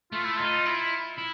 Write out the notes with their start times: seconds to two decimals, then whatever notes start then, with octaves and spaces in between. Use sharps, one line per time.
0.12 A3 F4
0.25 E4
0.37 D#4 F4
0.66 E4
1.18 E4